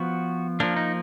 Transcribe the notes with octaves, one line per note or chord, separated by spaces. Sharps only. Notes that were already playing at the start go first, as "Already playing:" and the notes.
Already playing: F3 B3 F#4
F3 A#3 D4
D#4